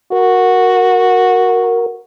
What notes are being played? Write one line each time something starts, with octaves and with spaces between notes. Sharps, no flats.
F#4 A#4